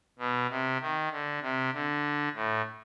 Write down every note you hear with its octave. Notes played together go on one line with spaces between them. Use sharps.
B2
C3
D#3
D3
C3
D3
A2